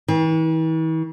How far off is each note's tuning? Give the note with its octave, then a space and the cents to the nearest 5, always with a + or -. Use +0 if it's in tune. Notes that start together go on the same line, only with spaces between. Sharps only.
E3 -45